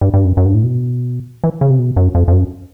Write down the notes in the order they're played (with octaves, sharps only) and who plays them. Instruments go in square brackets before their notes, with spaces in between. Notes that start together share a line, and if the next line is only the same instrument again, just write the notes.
[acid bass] G2
G2
F#2
F#2
G2
A2
B2
E3
C#3
C3
B2
F#2
F2
F2
F#2